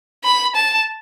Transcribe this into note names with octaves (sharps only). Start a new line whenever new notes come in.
B5
A5